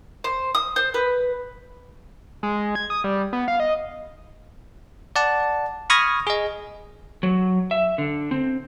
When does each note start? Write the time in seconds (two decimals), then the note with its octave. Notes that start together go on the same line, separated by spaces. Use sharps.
0.24 C5
0.55 D#6
0.76 C5
0.94 B4
2.43 G#3
2.75 G#6
2.90 D#6
3.04 G3
3.33 B3
3.48 F5
3.60 D#5
5.16 D5 F#5 A5
5.90 B5 C#6 D#6 F6 G#6 A#6
6.27 G#4 D#5
7.23 F#3
7.71 E5
7.98 D3
8.31 C4